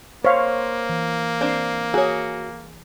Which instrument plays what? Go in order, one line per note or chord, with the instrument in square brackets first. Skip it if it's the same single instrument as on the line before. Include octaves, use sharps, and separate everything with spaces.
[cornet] A#3 [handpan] C5 [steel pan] C#5 F5
[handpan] E3
[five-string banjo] C4 D4 C5
[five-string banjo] F#4 C#5 [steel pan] G#4